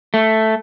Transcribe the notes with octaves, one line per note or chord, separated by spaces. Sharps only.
A3